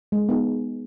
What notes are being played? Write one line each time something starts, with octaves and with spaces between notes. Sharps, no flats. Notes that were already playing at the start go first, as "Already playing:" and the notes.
G#3
B3 D#4 G#4